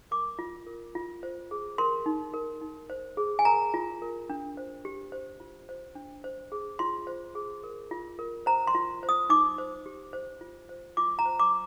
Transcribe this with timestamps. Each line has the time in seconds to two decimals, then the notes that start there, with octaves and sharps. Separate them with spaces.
0.11 A#4 D6
0.39 F4
0.66 A#4
0.95 F4
1.23 C5
1.51 G#4
1.78 A#4 C6
2.06 D#4
2.34 A#4
2.61 D#4
2.90 C5
3.17 G#4
3.39 G#5
3.45 A#4 A#5
3.74 F4
4.02 A#4
4.30 D4
4.57 C5
4.85 G4
5.12 C5
5.40 F4
5.69 C5
5.95 D4
6.24 C5
6.52 G#4
6.79 F4 C6
7.07 C5
7.35 G#4
7.64 A#4
7.91 F4
8.19 A#4
8.46 C5 A#5
8.67 C6
8.75 F4
9.03 C5
9.09 D#6
9.30 D#4 D6
9.58 C5
9.86 G4
10.13 C5
10.41 F4
10.69 C5
10.97 F4 D6
11.19 A#5
11.26 C5
11.40 D6